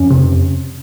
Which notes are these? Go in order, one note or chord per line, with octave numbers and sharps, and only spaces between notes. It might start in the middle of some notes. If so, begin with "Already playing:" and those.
Already playing: F2 C#4
C3